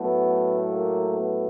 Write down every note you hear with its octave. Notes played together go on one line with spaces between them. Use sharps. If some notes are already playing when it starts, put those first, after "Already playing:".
Already playing: A2 F#3 A3 B3
A#3
B3